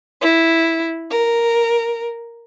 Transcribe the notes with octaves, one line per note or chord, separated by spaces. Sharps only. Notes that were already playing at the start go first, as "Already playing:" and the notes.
E4
A#4